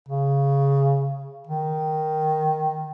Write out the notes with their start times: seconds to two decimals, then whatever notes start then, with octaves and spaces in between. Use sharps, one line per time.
0.08 C#3
1.47 D#3